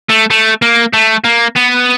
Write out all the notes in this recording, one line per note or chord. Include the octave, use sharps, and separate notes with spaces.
A3
A3
A#3
A3
A#3
B3